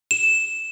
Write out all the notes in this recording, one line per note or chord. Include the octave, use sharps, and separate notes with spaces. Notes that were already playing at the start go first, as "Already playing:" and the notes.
E7